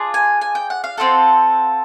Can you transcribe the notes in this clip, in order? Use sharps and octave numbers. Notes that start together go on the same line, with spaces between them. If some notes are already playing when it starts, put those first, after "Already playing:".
Already playing: D4 F4 G#4
G#5
G#5
G5
F#5
F5
C4 F4 A4 F#5